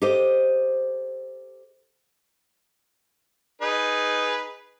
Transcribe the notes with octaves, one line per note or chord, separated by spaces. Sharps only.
G4 A4 C5 D#5
D#4 G#4 B4